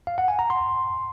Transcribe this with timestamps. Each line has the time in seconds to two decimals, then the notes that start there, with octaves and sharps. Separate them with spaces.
0.07 F5
0.18 F#5
0.28 G#5
0.39 A#5
0.50 C6